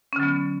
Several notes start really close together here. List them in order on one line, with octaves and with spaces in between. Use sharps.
C#4 D3 F#3 B3